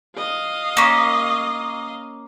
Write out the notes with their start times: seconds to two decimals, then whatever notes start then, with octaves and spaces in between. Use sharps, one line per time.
0.17 D#5 F5
0.77 A#3 C#4